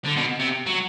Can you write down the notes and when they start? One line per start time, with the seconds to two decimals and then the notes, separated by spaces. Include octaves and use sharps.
0.05 D3
0.17 B2
0.40 C3
0.67 F#3